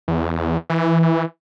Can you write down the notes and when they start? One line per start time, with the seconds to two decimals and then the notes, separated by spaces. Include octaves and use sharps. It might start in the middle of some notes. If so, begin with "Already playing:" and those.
0.08 E2
0.70 E3